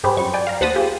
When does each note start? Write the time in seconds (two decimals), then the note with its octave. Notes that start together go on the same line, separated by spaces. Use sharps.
0.04 G2 G4 G#4 B4 C5
0.17 F#2 C#6
0.34 D5 G5 G#5
0.47 F5 A#5
0.61 D#2 C5 F#5 A5 B5 D#6
0.75 F4 G4 G#4